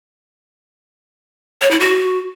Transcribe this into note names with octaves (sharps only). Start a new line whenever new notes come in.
C#5
E4
F#4